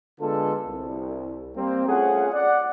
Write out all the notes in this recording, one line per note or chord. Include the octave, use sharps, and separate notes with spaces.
D3 G#3 B3 F4 A4
C2
G3 A#3 C4
A3 C#4 F4 G#4 F#5
D5 F#5